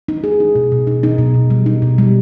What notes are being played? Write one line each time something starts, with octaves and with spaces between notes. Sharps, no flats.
D#4
G#4
D#4
B2
B2
D#4
D#4
B2
B2
G3
D#4
B2
G3